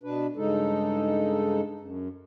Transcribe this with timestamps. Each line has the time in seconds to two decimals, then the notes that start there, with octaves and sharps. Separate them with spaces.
0.03 B2 D4 B4
0.36 G2 C#3 G#3 D#4 A4
1.80 F#2